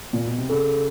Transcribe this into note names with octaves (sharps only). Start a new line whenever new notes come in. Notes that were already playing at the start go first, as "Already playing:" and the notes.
A#2
B2
C3
C#3 A4